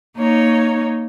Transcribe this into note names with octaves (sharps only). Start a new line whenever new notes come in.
A#3 D#4 C#5